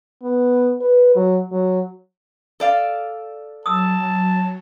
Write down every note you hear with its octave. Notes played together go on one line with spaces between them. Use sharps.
B3
B4
F#3
F#3
A4 D5 F5
F#3 A5 D#6 E6